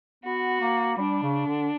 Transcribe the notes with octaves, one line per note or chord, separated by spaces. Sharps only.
B3 F#4
A#3
G3 D4
C#3
D3